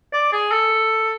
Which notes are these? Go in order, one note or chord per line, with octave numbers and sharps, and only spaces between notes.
D5
G#4
A4